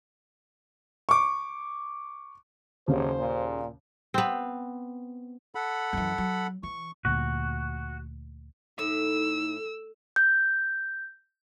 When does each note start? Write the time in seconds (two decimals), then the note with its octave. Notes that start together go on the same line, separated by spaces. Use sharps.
1.09 C#6 D6
2.88 F#1 D#2 C#3 C5 C#5
3.18 A#2
4.14 B3 C4
5.55 A4 F#5 B5
5.93 F#2 E3
6.18 F#3
6.63 E3 C#6
7.05 D2 A#2 F#4
8.79 A2 D#4 E6
10.16 G6